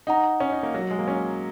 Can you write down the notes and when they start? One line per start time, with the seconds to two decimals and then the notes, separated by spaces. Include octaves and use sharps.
0.07 D#4 D#5 F#5 A#5
0.40 C#4
0.52 D#4
0.63 A#3
0.74 F#3
0.91 G#3
0.98 A#3
1.08 C#4